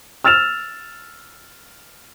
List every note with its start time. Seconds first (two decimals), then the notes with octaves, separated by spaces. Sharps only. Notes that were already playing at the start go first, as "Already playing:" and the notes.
0.24 E6 F6 A6 E7 F7